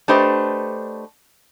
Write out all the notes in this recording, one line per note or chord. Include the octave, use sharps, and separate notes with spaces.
A3 D4 G4 B4 C5 D#5